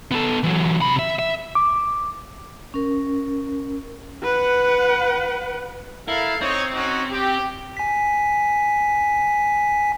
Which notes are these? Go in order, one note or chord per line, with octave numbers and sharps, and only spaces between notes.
B3 A4
E3 F#3
C3 B5
E5
E5
D6
C#4 A#4
B4 F#5
E4 A4 A#4 F5
C4 D#4 C#5
C#4 D#4 F#4
G4
G#5 B6